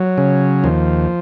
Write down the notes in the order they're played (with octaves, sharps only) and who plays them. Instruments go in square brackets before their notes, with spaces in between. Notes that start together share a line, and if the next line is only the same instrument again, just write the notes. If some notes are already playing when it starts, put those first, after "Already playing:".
Already playing: [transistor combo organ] F#3
C#3
D#2 F3